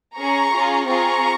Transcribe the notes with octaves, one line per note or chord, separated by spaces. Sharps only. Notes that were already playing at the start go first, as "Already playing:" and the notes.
C#4 G#4 A#5 C#6
C#4 F4 G#4
C4 F4 G#4 A#5 C#6